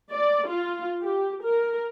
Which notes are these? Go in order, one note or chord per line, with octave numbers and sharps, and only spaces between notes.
D5
F4
G4
A#4